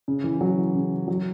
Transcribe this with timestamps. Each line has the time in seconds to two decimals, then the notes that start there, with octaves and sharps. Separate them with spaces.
0.08 C#3
0.24 E3
0.41 F#3
0.58 E3
0.75 C#3
1.08 F#3